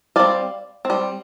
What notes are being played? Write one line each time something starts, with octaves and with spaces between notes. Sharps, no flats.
G3 C4 D5 F5
G3 C4